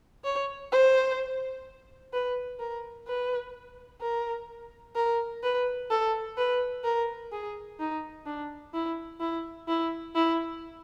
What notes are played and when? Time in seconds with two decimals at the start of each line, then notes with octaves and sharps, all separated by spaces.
0.24 C#5
0.72 C5
2.13 B4
2.59 A#4
3.07 B4
4.01 A#4
4.96 A#4
5.43 B4
5.90 A4
6.38 B4
6.84 A#4
7.32 G#4
7.79 D#4
8.26 D4
8.74 E4
9.20 E4
9.68 E4
10.15 E4